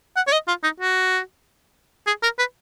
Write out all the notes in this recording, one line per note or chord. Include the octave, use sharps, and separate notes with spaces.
F#5
C#5
D#5
F4
D#4
F#4
G#4
A#4
B4